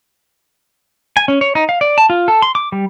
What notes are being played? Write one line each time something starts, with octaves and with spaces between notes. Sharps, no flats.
G#5
C#4
C#5
D#4
F5
D5
A5
F4
A4
C6
D6
G3